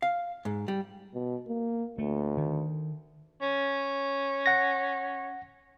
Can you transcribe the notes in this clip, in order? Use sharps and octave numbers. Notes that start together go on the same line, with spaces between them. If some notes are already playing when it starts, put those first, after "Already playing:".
F5
G#2
G3
B2
A#3
D2 A3
D#3
C#4
F#5 A#6